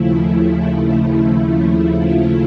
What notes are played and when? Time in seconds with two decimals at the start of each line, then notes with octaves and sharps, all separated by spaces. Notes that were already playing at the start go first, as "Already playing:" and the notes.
Already playing: D#2 C#3 F3 A3 E4
1.28 E4
1.97 F4